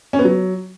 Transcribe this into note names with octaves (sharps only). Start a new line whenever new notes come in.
C#4
B3
F#3